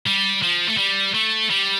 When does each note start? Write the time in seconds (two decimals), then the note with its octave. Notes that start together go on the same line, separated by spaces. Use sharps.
0.07 G3
0.43 F3
0.68 A3
0.78 G3
1.15 A3
1.51 G3